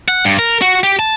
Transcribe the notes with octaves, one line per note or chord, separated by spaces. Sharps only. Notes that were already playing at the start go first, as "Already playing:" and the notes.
F#5
G2
A#4
F#4
G4
A5